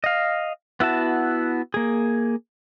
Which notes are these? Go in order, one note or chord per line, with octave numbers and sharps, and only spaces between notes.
D#5 F5
B3 E4 F#4 A5
A#3 G#4